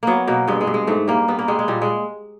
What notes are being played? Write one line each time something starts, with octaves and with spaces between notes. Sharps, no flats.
F#3 A#3 B3
B2 A#3
G2 G#3
G#3
G2
G#3
G#2 A3
G3 A#3
G3 B3
A#3
G3 G#3
G#3
A#2 G3
G#3